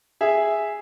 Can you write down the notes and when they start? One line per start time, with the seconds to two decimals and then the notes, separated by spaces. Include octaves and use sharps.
0.21 G#4 E5